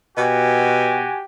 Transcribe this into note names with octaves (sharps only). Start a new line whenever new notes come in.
B2 F#4 G4 G#5